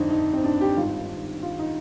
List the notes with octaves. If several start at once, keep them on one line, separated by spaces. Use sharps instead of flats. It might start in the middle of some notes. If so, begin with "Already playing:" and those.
Already playing: G1 F2 D3 C4 D4 D#4
D#4
C4
D4
G4
G#1 G2 D#3 F4
F4
D#4